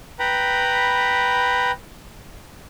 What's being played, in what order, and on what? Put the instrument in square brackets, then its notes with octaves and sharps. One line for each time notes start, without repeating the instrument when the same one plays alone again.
[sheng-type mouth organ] B4 G5 A#5 B5